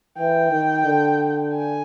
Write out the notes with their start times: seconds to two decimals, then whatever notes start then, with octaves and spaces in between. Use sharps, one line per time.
0.17 E3 G5
0.52 D#3
0.86 D3
1.54 G#5